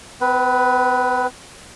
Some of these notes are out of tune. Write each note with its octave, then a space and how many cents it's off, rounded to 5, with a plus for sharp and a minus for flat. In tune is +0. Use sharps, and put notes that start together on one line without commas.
C4 -45 B4 +0